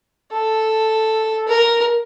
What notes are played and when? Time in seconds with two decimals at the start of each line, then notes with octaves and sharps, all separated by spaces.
0.32 A4
1.47 A#4